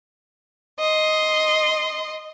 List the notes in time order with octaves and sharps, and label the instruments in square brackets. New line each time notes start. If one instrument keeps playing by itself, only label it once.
[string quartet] D#5 C6